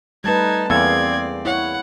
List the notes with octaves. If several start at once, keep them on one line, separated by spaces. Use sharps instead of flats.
G3 A3 D#4 B4 A5 G#6
E2 A#3 C4 G#4 A4 D5 F5 G#6
E4 C#5 F#5